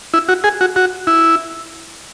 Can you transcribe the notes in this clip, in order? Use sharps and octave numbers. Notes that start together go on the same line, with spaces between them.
E4
F#4
G#4
F#4
F#4
E4